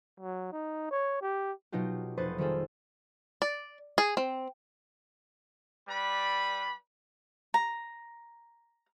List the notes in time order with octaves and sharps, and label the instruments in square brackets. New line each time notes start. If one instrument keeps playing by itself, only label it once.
[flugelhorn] F#3
D#4
C#5
G4
[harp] B2 F#3 D#4 F4 G4
F1 B4 C5 C#6 D#6 A6
D#3 G3 C4 F4 G#4 A4
[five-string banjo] D5
G#4
C4
[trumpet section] G3 B4 D5 B5
[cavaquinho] A#5